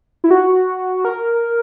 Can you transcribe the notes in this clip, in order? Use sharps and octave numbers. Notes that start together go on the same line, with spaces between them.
E4
F#4
A#4